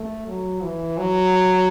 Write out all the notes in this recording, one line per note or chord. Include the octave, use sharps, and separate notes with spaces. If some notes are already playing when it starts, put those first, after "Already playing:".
Already playing: A3
F#3
E3
F#3